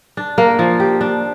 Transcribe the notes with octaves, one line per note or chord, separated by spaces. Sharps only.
D4
A#3
F3
G4
D4